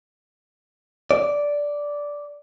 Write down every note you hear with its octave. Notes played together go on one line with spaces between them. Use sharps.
D5